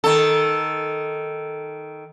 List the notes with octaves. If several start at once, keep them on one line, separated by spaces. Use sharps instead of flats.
D#3 A4